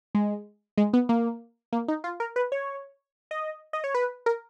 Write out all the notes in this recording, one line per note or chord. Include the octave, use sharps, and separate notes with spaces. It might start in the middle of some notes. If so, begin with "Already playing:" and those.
G#3
G#3
B3
A#3
A#3
D#4
F4
A#4
B4
C#5
D#5
D#5
C#5
B4
A#4